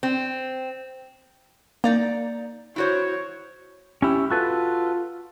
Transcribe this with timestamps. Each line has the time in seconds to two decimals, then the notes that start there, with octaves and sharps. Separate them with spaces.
0.03 C4
1.84 A#3 D#4 D5 A#5
2.76 E4 F#4 C5 C#5
4.02 C#4 E4 G4
4.31 F4 F#4 A4 B4